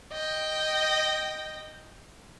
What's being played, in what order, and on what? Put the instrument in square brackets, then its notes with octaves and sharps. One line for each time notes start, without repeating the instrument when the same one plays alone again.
[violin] D#5 G5